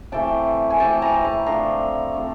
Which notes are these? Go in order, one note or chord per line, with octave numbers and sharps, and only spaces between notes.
C3 E3 A3 G5 A5
G#5
C3 E3 A3 G5 A5
G#5 A#5
A5 B5
C3 F3 A3 D4 A#5 C6
C3 F3 A3 D4